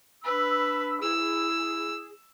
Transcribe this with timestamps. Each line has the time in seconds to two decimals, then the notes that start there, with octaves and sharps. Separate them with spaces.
0.24 D4 B4 B5 E6
1.02 E4 G#4 E6